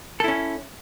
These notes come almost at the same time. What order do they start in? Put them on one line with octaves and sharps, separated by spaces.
A4 E4 C#4